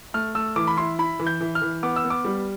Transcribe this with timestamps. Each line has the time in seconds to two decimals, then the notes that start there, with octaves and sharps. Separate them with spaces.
0.14 A3 F6
0.35 A3 E6
0.56 E3 D6
0.67 B5
0.77 E4 C6
0.99 E4 B5
1.20 E3
1.27 G6
1.41 E3
1.55 F6
1.62 E3
1.83 B3 D6
1.96 E6
2.05 B3
2.10 D6
2.25 G3